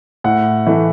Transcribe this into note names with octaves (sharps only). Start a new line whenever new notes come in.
A2 F#5
E3 A3